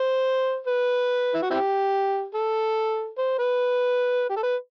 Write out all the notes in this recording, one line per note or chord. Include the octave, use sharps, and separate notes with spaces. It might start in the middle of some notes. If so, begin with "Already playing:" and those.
Already playing: C5
B4
E4
F#4
C4 E4 G4
A4
C5
B4
G4
A4
B4